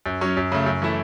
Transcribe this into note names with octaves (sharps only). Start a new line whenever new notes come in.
F#2
F#3 C#4
F#2
C#3 A3
F#2
E3 A3 E4 A4